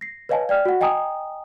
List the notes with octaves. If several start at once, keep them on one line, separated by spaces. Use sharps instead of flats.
A#6 C7
B4 C#5 D#5 F5 G#5 A5
D5 G5 F6
F#4 F#5
D#5 G5 G#5 A#5 D#6